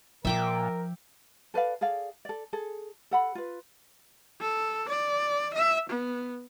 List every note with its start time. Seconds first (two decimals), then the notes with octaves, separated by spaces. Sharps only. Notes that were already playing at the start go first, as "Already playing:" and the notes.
0.25 A#2 F3 A#4 E5 G5 D6
1.54 A4 B4 D5 F5
1.81 G#4 A4 D5 F5
2.25 A4 D5
2.53 G#4 A4
3.11 A4 F#5 B5
3.35 F4 B4
4.41 A4
4.89 D5
5.54 E5
5.90 B3